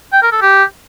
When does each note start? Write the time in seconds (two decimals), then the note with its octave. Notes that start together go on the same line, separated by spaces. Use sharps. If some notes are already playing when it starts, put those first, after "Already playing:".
0.13 G5
0.23 A#4
0.32 A4
0.42 G4